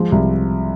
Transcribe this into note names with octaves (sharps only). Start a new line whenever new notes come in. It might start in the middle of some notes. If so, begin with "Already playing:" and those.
Already playing: F3 G#3
C2